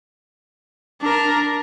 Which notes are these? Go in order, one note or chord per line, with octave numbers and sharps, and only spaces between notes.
D4 A#4